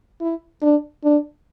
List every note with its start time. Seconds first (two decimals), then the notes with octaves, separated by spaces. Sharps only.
0.21 E4
0.62 D4
1.04 D4